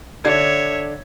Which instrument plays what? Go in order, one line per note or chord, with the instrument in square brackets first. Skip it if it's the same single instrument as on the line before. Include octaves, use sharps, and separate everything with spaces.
[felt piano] D3 D4 G#6 [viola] C#5 E5